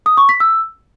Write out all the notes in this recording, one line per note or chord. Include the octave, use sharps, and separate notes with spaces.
D#6
C#6
B6
E6